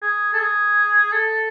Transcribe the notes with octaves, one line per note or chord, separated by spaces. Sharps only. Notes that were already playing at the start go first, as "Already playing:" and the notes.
G#4
A4
G#4
A4